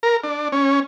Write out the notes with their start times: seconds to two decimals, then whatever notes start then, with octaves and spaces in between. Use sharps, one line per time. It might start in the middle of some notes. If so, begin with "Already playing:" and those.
0.03 A#4
0.24 D4
0.52 C#4